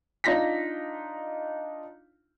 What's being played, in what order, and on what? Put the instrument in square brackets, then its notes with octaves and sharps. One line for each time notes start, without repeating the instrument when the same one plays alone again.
[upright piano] D4 D#4 F4 A#6 B6